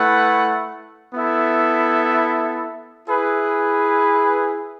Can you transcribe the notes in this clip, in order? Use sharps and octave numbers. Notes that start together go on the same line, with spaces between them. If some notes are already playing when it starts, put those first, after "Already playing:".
Already playing: A3 E4 B4 F#5
B3 E4 A4 E5
E4 G#4 B4